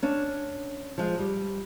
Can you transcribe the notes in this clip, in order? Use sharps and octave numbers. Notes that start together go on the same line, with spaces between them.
C#4 D4
F3 G#3
G3